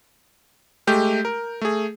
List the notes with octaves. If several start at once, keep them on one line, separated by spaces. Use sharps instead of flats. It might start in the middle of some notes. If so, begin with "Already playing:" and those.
G#3 A3 G4 G6
A#4
A3 G#4